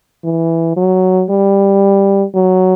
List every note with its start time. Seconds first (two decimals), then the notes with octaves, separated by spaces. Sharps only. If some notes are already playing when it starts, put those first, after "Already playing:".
0.24 E3
0.76 F#3
1.29 G3
2.34 F#3